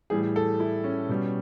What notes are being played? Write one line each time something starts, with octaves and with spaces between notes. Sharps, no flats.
A2 E3 G3 G#4
A4
E4
C#4
B2 G3